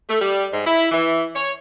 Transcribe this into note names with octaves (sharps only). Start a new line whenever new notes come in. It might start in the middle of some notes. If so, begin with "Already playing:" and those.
A3
G3
G#2
E4
E3
C#5